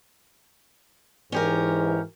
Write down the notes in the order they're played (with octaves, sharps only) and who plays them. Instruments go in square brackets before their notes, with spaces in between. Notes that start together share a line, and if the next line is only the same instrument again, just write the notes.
[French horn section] G#2 E3 [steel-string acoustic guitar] C#4 G4 A#4